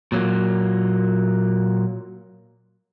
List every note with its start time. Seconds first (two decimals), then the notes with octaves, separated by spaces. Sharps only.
0.12 A#2 F#3 A#3